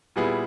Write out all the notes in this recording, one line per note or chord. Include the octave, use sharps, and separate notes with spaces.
A#2 G3 B3 E4 G#4